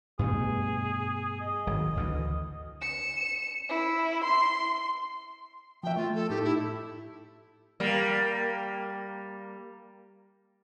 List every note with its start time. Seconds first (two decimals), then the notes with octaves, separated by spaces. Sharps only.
0.19 G2 B2 A3 G#4
1.41 D#5
1.67 G#1 F#3
1.97 D2 D3 E3
2.81 C#7 E7
3.69 E4
4.24 C6
5.83 F3 E5 G5
5.96 A3 F4
6.15 A4
6.29 A2 D#4 G4 A4
6.44 E4
7.80 G3 A#3